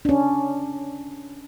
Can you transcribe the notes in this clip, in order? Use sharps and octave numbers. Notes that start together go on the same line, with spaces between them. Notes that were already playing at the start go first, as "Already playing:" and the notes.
C#4 D4